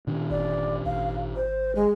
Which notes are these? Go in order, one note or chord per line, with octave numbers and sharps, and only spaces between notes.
A#2 D#3 D4
G1 D5
G#1 F5
C5
G#3